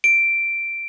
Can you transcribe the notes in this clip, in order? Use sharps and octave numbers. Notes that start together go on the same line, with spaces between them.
D7